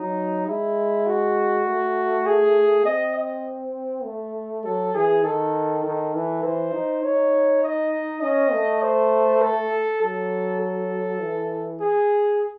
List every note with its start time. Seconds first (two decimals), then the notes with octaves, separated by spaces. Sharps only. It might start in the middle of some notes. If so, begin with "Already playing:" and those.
Already playing: F#3 D#4
0.47 G#3 E4
1.06 F#4
1.66 A3
2.26 G#4
2.85 C4 D#5
3.16 D#5
4.04 A3
4.64 F#3 A4
4.94 E3 G#4
5.24 D#3 A4
5.84 D#3 A4
6.14 E3
6.43 E3 C5
6.73 D#4
7.03 D#4 C#5
7.63 D#5
8.22 C#4 D#5
8.52 A3
8.82 C5
9.42 A4
10.01 F#3 A4
10.61 A4
11.21 E3
11.80 G#4